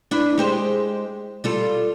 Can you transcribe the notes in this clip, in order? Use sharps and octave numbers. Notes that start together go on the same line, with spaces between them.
D4 E4 B4
G#3 G4 C5
G3 F4 A4